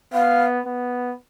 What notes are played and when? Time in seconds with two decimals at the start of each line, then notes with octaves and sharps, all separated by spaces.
0.13 B3 F5
0.66 B3